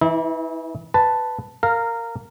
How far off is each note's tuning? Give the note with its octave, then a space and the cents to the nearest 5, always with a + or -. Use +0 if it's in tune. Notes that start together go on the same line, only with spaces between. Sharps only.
E3 +0 E4 -40
B4 +10 A5 +0
A#4 -15 F5 +0